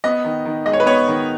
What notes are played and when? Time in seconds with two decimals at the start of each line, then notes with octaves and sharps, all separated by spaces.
0.04 B3 D#5
0.25 D#3
0.45 D#3
0.66 G#3 D#5
0.73 C#5
0.80 B4
0.86 B3 C#5
1.07 D#3